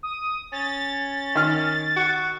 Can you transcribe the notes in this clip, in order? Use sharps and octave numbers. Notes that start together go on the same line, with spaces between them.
D#6
C#4 A6
D#3 F6
F#4